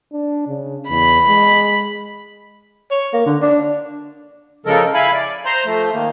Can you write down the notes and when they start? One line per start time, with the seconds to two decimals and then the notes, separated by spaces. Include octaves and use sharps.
0.13 D4
0.47 C#3
0.90 E2 B5
1.28 G#3
2.91 C#5
3.13 A#3
3.26 D3
3.42 D4
4.66 C#3 F3 G#3 A4 A#4
4.94 E4 F5 G#5 B5
5.13 D5
5.45 C5 A#5 C6
5.66 F3 A3
5.93 D#3 A#3